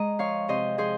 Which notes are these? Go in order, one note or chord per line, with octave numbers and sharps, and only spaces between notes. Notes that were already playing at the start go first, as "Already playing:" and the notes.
Already playing: G#3 D#5 A#5
F3 C#5 F5
C3 C5 D#5
F3 G#4 C5